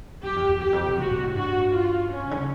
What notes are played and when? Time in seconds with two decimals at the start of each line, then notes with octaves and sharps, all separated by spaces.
0.23 F#2 G4
0.36 F2
0.48 E2
0.61 E2 G4
0.73 F2
0.86 B2
0.98 C3 F#4
1.11 A#2
1.23 A2
1.35 G2 F#4
1.73 F4
2.10 C#4
2.23 C3
2.31 D3
2.36 C#3